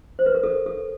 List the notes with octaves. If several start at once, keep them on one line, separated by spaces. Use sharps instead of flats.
C5
B4
A#4
A4
A4